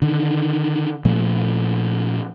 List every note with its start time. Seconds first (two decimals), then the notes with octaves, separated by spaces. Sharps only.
0.02 D3 D#3
1.05 A#2 F3 A3